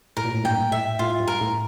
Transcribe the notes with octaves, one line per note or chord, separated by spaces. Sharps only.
A2 A#4
A#2
A2
G2 A#2 G5
A2 E5
A2 F4
G2
A#4
A2